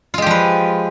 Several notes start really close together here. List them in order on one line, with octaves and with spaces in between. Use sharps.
F4 G#3 G4 F3 B4